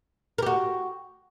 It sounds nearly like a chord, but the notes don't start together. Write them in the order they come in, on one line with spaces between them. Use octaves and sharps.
A#4 G4 F#4